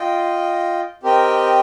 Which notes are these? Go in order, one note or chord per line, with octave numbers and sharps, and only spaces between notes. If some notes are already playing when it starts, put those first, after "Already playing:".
Already playing: F4 D#5 G5
C4 G4 A#4 D#5 G5